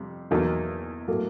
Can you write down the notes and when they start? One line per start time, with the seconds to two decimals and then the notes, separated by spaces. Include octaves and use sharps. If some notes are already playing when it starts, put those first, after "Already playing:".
Already playing: F2 C3 G3
0.31 E2 B2 F#3 A#3 D#4
1.08 A2 F#3 A#3